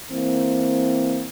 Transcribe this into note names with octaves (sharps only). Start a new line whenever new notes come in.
E3 A#3 C4